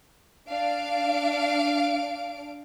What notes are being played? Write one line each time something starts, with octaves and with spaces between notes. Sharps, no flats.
D4 F5 D7